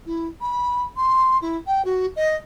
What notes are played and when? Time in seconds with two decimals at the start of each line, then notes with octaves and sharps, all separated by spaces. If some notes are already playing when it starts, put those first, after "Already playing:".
0.06 E4
0.41 B5
0.96 C6
1.42 E4
1.67 G5
1.85 F#4
2.16 D#5